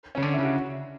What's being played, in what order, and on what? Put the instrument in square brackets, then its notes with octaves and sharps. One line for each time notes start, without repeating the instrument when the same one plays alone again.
[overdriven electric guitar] C#3 [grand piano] C#4
[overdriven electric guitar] D3 [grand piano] D4
[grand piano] E4
[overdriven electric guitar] C#3
[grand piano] F#4